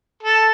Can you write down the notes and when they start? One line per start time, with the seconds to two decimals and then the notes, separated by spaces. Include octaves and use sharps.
0.23 A4